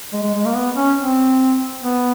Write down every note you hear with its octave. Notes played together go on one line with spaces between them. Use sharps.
G#3
G#3
G#3
A#3
B3
C#4
C4
B3